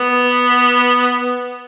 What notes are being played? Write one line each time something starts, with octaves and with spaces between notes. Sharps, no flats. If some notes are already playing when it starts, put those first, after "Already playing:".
Already playing: B3